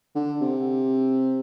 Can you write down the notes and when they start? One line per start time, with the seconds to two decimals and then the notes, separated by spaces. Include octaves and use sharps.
0.15 D3
0.41 C3